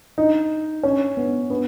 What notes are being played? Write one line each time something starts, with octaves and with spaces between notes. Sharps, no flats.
D#4
C#4
B3
B3